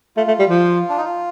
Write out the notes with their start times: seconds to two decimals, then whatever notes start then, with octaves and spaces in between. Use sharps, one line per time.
0.16 A3 F4
0.28 A3
0.39 G3
0.50 F3
0.89 D4
0.98 D#4
1.05 F4